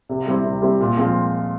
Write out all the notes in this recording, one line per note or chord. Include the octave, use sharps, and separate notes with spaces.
C3
G3 C4 E4
C3
G3 C4 E4
A#2
F3 G#3 C4 F4